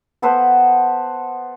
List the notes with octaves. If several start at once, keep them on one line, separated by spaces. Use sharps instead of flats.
B3 A4 B4 C5